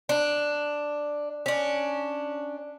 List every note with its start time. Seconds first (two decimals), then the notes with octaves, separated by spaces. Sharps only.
0.09 D4
1.46 C#4 D4